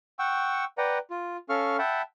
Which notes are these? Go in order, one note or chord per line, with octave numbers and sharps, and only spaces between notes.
F#5 G5 C#6 E6
B4 D5 F#5 G5 A#5
F4
C#4 A4 F5 C#6 F6
E5 F#5 G5 A5 B5